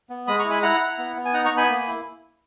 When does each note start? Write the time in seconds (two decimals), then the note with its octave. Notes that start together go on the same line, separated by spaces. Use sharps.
0.10 B3
0.27 G#3 B5 D#6
0.39 A#5 C#6
0.45 E4
0.50 G#5 B5
0.62 E4 F#5 A#5
0.80 E4
0.98 B3
1.16 B3
1.25 G#5
1.34 D#4 F#5 A#5
1.45 A#5 C#6
1.52 B3
1.57 G#5 B5
1.70 A#3
1.87 E4